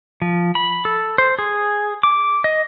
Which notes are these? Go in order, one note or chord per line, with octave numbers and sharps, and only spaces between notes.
F3
B5
A4
C5
G#4
D6
D#5